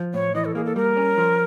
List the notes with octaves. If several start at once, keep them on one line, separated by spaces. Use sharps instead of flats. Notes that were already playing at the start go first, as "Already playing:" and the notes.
Already playing: F3
A2 C#5
E3 D#5
A4
A#3 G#4
A4
G3 A#4
C#4
F3